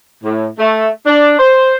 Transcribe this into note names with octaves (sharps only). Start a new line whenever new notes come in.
A2
A3
D4
C5